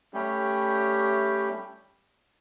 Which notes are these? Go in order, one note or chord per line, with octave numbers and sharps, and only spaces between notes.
G3 A3 C#4 G4